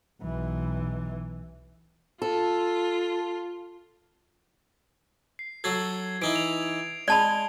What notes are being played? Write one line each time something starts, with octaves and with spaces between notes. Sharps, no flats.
B1 E3
F4 A4
C7
F#3 F#4 A4 G#6 C7
E3 D#4 E4 D7
F7
G#3 D5 A5 B5